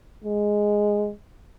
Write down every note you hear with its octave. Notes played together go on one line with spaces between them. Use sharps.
G#3